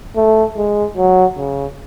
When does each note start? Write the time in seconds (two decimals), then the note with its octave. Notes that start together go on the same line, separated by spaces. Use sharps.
0.16 A3
0.57 G#3
0.97 F#3
1.38 C#3